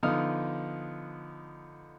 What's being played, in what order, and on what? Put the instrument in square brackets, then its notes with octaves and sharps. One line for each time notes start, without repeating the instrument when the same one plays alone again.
[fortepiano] D3 F3 B3 D#4 D#6 F6